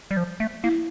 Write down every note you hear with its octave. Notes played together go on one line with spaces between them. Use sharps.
G3
F3
A3
A#3 E4